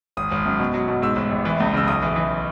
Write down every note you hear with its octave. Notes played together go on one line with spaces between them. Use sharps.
G#1 D#6
G#1
F#2
B2
F#3
B2
G#2 E6
A1
A1
E3
C#2
C#3 E6
B1 D#6
E3
E3